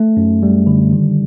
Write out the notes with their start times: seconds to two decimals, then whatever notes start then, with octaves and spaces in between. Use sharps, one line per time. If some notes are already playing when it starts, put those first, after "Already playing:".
Already playing: A3
0.17 F#2
0.43 G3
0.67 D3
0.93 D#3